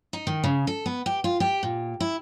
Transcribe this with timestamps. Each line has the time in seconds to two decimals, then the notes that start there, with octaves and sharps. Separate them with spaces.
0.13 D#4
0.27 D#3
0.44 C#3
0.67 A4
0.86 B3
1.06 G4
1.24 F4
1.40 G4
1.63 A#2
2.00 E4